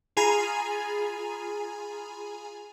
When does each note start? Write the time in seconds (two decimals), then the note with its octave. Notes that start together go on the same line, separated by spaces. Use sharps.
0.17 F4 G#4 G#5 A#5 B5